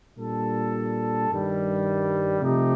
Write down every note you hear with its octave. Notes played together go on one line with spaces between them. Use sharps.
A#2 G3 D4 A4
G2 D#3 G3
C3 F3 A3 D#4 G4